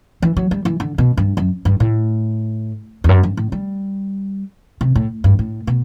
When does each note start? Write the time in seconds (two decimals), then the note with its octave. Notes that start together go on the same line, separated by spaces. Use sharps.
0.22 E3
0.37 F#3
0.51 G3
0.65 E3
0.80 D3
0.98 B2
1.17 G2
1.37 F#2
1.65 G2
1.80 A2
3.04 E2
3.09 F#2
3.23 G2
3.37 A2
3.52 G3
4.81 C3
4.96 A2
5.24 G2
5.39 A2
5.67 B2